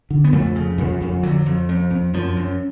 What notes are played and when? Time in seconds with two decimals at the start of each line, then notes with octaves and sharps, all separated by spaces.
0.10 D3
0.24 B3
0.32 F2 A3
0.56 C#3
0.78 F2
1.01 F2
1.23 D3 F#3
1.46 F2
1.69 F2
1.91 F2
2.14 F#2 F3
2.36 F#2